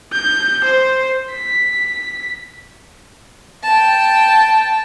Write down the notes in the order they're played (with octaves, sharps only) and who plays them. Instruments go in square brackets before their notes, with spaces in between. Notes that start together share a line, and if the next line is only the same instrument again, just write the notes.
[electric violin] G6
C5
B6
[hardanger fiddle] G5 A5